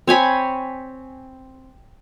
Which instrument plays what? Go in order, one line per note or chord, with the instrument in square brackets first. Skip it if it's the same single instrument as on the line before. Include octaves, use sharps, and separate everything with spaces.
[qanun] C4 C#5 G#5 B5